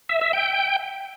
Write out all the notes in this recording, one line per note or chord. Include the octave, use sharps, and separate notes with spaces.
E5
E5
G5